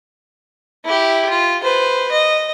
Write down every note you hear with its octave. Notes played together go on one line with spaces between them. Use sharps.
E4 G4
F4
B4 C5
D#5